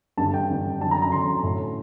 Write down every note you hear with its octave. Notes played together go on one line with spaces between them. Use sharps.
G2 D3 A5
G5
G2 D3
F#2 D3 A5
A#5
A#5
F#2 D3 C6
A2